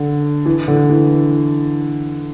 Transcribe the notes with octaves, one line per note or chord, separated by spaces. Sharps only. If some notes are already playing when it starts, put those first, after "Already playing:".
Already playing: D3
E3
D3
E3